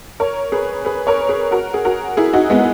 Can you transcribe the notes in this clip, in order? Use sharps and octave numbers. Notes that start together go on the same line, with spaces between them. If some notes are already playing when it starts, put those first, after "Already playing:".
A#4 C#5
G#4 B4
G#4 B4
A#4 C#5
G#4 B4
F#4 A#4
G#4
F#4 A#4
E4 G#4
D#4 F#4
G#3 B3